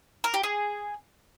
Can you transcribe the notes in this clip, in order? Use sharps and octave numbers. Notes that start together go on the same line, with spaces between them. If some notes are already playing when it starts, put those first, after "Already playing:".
A#4
G4
G#4